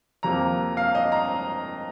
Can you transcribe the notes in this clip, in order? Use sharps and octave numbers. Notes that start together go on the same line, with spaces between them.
F2 C3 F3 A#3 A#5
F5
D#5
A#5